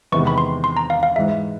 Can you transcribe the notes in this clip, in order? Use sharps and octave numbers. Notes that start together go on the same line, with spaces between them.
E2 C3 D#3 G#3 B3 C#6
B5
C6
C6
A#5
F5
F5
G#2 E3 G#3 E5